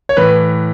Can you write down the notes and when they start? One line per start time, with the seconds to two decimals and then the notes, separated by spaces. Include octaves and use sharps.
0.09 C#5
0.17 A2 E3 B4